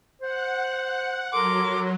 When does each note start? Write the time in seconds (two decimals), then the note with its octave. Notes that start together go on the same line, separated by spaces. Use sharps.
0.22 C5 F#5
1.33 F#3 A4 A#4 C6 D6